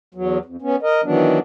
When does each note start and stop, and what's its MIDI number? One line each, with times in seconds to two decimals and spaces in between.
0.15 0.38 40
0.15 0.38 54
0.45 0.57 41
0.62 0.76 59
0.62 0.76 61
0.83 1.01 70
0.83 1.01 75
1.04 1.39 51
1.04 1.39 52
1.04 1.39 54
1.04 1.39 59
1.04 1.39 62